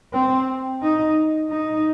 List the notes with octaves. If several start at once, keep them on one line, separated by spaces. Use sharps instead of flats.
C4
D#4
D#4